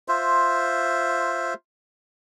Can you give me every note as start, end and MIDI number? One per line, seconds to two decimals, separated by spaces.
0.08 1.54 65
0.08 1.54 72
0.08 1.54 76